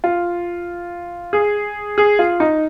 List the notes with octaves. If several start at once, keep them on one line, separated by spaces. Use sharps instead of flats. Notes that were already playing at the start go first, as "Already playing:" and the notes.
F4
G#4
G#4
F4
D#4